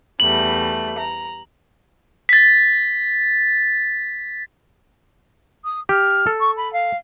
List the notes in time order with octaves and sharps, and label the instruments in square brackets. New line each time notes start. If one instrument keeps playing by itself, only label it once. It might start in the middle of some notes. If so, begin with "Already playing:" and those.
[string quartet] E2 G3 A3 [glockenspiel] F#7
[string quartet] A#5
[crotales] A6 B6
[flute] D#6
[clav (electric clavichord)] G4 [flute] F6
[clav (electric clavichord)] A4
[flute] C#6
B5
F5